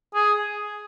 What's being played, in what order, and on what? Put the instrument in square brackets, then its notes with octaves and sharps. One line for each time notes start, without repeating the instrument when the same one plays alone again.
[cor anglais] G#4